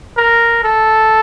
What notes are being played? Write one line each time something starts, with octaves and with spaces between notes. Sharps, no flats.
A#4
A4